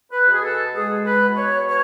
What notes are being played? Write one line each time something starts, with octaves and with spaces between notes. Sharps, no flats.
B4
B2 G#4
A4
G#3 G#4
B4
B2
C#5
C#5